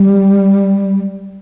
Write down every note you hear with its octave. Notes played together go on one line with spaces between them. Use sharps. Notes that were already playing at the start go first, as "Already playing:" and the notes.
Already playing: G3